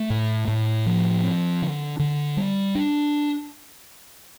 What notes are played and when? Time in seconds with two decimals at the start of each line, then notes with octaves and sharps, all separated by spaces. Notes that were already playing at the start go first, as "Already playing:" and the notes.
Already playing: A3
0.10 A2
0.48 A2
0.86 F3
1.23 C4
1.62 D3
1.99 D3
2.37 G3
2.75 D4